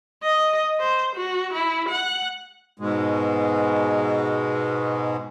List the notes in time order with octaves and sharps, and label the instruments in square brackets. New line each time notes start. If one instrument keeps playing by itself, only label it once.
[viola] D#5
C5
F#4
E4
F#5
[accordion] G#2 B2 G#3